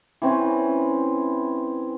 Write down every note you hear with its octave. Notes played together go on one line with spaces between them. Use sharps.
E3 C4 C#4 B4